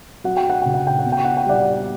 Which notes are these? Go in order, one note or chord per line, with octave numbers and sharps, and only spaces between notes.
F#3 F#5
G5
F#5
C#3 G5
F#5
G5
F#5
B2
G5
F#5
G5
G3 D5 F#5